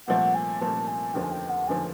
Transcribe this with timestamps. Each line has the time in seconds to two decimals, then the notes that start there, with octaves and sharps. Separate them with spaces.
0.07 C2 A#2 F3 A3 F#5
0.34 G#5
0.61 C2 A#2 F3 A3 A5
0.87 G#5
1.14 F1 D#2 D3 F3 G5
1.23 G#5
1.31 G5
1.49 F#5
1.67 F1 D#2 D3 F3 G#5